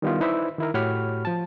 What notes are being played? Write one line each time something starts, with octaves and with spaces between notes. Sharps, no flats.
D#3 G3 B3 E4 F4
D#4 E4 B4 C5 D5 E5
D#3 E4 A#4
A2 F#4 G4 C#5 B5 F6
F3 A5